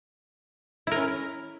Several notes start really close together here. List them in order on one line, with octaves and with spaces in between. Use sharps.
E4 A#4 C#4